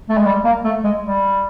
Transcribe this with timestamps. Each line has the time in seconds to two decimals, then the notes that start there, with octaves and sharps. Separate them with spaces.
0.10 A3
0.17 G#3
0.26 G3
0.45 A#3
0.64 A3
0.84 G#3
1.03 G3